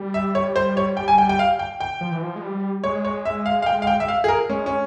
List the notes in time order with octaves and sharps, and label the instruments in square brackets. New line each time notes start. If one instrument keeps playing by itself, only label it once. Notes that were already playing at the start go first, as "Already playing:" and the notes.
Already playing: [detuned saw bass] G3
[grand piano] E5
C#5
C5
C#5
G5
G#5
G5
G5
F5
G5
G5
[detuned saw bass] F3
E3
F3
G#3
G3
[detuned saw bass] G#3 [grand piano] C#5
[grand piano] C#5
E5
F5
F5
G5
F5
G5
E5
F5
G#4
A#4
[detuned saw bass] G#3 [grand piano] C#4
[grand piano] C#4